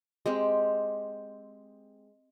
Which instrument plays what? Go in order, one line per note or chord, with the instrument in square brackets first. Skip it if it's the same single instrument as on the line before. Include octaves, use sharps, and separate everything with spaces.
[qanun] G#3 C4 G4